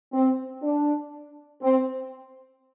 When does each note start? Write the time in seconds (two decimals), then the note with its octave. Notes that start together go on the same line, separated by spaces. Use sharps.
0.13 C4
0.61 D4
1.61 C4